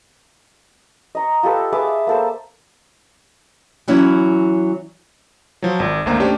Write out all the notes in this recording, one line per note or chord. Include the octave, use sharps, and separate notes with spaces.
D#5 A#5 C#6
F4 G4 A4 B4
G#4 B4 E5 D6
A#3 A4 C5
E3 F#3 C#4 E4
F3 F#3
G#1
G#1 D2 G#2 A#3 C5 A#5
A3 C#4 D4 G4 C5 C#5